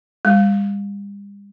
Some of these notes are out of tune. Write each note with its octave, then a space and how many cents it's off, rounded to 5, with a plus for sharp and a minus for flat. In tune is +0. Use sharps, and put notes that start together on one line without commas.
G3 +45